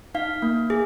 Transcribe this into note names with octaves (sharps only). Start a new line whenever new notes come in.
D#4 F5
A#3
G#4